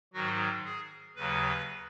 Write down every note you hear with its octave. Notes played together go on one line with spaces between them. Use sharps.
G#2 D#3 F#3 F#4
G#4
D#2 C#3 F#3 B4